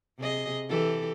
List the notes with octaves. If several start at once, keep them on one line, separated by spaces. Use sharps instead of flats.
C3 G#4 D#5
E3 G4 A4